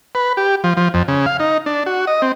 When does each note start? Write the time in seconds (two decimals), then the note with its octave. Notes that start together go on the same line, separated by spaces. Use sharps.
0.15 B4
0.37 G4
0.64 F3
0.77 F3
0.94 F2
1.08 C#3
1.26 F5
1.40 D#4
1.66 D4
1.86 F#4
2.07 D#5
2.22 C4